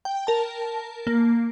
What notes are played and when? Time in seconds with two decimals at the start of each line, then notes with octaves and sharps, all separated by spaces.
0.05 G5
0.27 A#4 A5
1.07 A#3